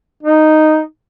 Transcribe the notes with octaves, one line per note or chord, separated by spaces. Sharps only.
D#4